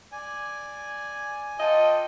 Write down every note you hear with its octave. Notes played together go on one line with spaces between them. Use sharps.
D5 G#5
F4 A4 D#5 G5